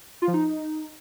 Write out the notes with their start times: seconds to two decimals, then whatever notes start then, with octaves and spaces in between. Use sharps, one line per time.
0.22 F4
0.28 F3
0.34 D#4